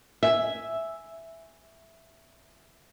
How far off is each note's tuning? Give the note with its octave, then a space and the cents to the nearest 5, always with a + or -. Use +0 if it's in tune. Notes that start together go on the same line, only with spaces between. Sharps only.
E5 +0 G#5 +0